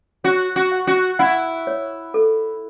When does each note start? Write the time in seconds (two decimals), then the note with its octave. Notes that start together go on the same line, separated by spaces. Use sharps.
0.24 F#4 C#5
0.56 F#4
0.71 F#5
0.87 F#4
1.19 E4 F#5
1.67 C#5
2.14 A4